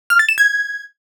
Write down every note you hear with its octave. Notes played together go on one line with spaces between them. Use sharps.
F6
A6
E7
G#6